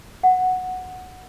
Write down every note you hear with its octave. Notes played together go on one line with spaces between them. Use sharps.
F#5